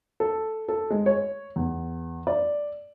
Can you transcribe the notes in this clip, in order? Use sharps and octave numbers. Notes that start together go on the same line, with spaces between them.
A4
A4
G#3
C#5
E2
D5